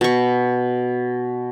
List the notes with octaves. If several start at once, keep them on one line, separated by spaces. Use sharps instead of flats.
B2 C#6